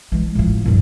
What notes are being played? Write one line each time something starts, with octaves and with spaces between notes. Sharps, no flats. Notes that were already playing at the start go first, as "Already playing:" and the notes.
E3 G#3
A1 F3
C2 G2